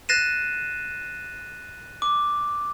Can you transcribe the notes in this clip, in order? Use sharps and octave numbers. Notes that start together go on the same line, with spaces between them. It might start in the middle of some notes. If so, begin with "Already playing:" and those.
F#6 A6 A#6 C7 D#7 E7
D6